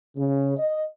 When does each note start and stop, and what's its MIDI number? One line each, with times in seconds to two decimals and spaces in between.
0.17 0.53 49
0.58 0.85 75